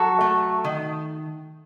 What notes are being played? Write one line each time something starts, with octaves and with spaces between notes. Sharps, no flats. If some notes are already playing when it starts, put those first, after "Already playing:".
Already playing: F#3 F#4 A4
A3
D#3